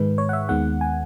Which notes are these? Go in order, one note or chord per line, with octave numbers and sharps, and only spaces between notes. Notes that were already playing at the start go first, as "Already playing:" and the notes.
Already playing: G#2 D#3 G#3 B4
C#5
F#5
E5
D#2 D#3 G#3 B3 F#5
G#5